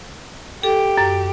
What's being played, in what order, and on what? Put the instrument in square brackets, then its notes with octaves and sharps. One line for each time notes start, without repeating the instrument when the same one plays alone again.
[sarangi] G4 [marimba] A4
[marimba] F#2